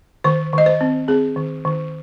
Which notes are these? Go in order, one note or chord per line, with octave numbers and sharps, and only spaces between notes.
D#3 C5
D#3
D#5
C5
C4
C4 G#4
D#3
D#3